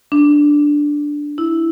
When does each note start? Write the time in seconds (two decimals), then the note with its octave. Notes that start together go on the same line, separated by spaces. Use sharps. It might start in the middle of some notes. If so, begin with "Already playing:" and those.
0.12 D4
1.38 E4